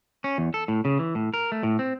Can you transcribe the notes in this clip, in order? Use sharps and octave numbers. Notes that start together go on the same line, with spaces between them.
C#4
E2
A4
A2
C#3
E3
A2
A#4
A3
A2
C4